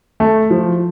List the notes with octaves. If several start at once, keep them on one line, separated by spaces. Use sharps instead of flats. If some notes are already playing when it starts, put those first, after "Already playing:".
A3
F3